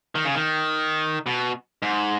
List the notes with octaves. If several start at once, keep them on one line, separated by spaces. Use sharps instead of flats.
D#3
C#3
D#3
B2
G#2